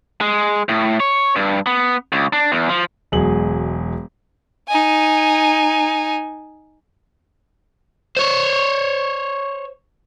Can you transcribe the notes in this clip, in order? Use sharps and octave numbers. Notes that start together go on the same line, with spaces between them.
G#3
A2
C#5
G2
B3
C#2
D4
E2
F3
E1 F#3 G#3 G#4 F#7
D#4 G#5
C5 C#5